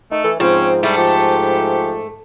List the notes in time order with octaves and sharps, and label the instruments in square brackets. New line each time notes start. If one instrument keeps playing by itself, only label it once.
[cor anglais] A3 [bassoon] D#4
[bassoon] E3 [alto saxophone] A4
[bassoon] G#2 [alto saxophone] F3 [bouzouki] C4 [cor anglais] C#4
[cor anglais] G3 [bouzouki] A3 [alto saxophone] E4
[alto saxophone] F3 [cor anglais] G4